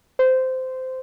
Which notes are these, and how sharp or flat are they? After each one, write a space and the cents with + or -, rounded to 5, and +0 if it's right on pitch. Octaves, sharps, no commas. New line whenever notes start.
C5 -15